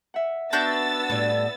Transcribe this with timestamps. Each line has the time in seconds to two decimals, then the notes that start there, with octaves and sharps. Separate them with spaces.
0.14 E5 F#5
0.53 B3 D4 F#4 E6 G6 A6
1.10 A2 G3